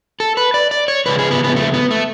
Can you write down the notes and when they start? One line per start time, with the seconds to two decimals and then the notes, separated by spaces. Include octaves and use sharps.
0.20 A4
0.37 B4
0.54 D5
0.71 D5
0.88 C#5
1.06 F2 C#3 G#3 B4
1.19 G#4
1.31 B3
1.44 B3
1.56 A3
1.74 B3
1.91 A3